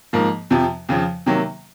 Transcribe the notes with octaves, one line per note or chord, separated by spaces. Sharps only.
G#2 F3 A#3
F2 C3 F3
F2 C#3 F3
C3 D#3 F#3 A#3